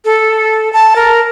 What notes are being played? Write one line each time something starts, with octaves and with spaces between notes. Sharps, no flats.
A4
A5
A#4